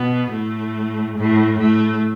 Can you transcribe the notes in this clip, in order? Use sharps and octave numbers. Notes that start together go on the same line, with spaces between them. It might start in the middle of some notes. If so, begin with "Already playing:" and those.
Already playing: B2 B3
A2 A3
A2 A3
A2 A3